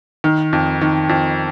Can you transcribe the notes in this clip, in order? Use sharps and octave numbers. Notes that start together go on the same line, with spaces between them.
D#3
F2
D#3
F2